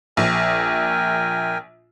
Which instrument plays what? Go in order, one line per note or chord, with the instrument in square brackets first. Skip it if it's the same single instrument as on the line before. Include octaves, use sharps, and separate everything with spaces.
[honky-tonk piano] A#1 [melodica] A#4 G5 G#5